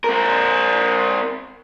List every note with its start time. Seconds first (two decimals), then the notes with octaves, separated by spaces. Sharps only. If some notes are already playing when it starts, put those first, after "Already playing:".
0.04 C4 A#4